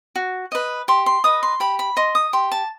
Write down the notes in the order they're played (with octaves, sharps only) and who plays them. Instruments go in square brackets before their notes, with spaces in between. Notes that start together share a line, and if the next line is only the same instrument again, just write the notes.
[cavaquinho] F#4
B4 D#5
G4 C6
C6
B4 D#5 D#6
C6
G4 B5
B5
D#5 C6
D#6
G4 C6
A5